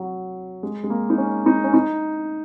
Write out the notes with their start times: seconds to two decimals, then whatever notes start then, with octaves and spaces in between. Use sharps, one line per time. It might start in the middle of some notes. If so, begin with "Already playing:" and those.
Already playing: F#3
0.63 G#3
0.84 G#3
0.90 A#3
1.10 D#4
1.18 C#4
1.46 D#4
1.64 C#4
1.74 D#4